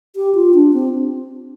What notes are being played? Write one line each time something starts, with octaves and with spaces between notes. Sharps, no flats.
G4
F4
D4
C4